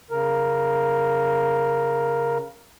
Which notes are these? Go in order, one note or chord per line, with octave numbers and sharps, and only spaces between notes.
C#3 A#4